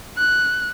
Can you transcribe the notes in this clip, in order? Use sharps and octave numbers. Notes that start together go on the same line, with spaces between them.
F#6